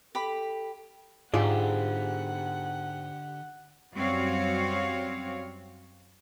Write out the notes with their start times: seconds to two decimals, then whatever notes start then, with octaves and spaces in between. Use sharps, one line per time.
0.15 G4 A4 B5
1.34 G#2 D3 F4 G4 G#4 D5 F#5
3.94 F#2 G3 C4 F#4 C#5 F5